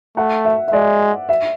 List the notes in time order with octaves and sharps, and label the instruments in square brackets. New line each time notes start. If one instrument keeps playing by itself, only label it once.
[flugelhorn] A3 [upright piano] F#5
[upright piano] E5
E5
[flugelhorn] G#3 [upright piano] D5
[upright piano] E5